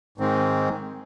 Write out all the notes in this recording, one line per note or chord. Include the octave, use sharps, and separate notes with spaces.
G#2 D#3 G#3 C4